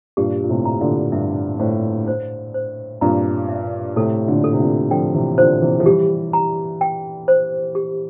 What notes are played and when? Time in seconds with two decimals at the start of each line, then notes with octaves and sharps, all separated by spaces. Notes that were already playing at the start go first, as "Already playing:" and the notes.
0.17 G2 A#2 G4
0.44 A#2
0.49 A2 C3
0.65 A#5
0.81 A#2 D3
1.12 G2 E5
1.59 A2 C5
2.08 C5
2.54 C5
3.01 G2 A#2 A#5
3.49 E5
3.96 A2 C3 A4
4.28 A#2 D3
4.44 A4
4.53 C3
4.59 A#2 D3
4.91 D3 F3 G5
5.15 C3 E3
5.38 A#2 D3 C5
5.62 C3 E3
5.80 F3
5.86 E3 G3 G4
6.33 A#5
6.81 G5
7.28 C5
7.75 G4